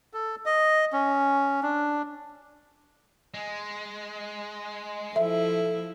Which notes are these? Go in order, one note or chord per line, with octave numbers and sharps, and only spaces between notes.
A4
D#5
C#4
D4
G#3
F3 E4 A4 E5